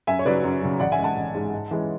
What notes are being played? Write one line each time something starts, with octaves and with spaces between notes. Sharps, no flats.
F#2 E5 G#5
C#5
C#3 F#3 B4 D5
F#2
C#3 F#3
A1 D5 F#5
E5 G#5
G#2 G#3
F#5 A5
A1
G#2 G#3
G#2
E3 G#3 C#4